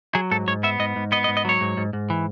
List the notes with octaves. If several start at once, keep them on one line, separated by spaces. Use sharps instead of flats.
F#3 G#4
G#2 A4
G#2 C#5
B3 E5
G#2 D#5
G#2
B3 D#5
D#5
G#2
D#5
F#3 C#5
G#2
G#2
G#2
E3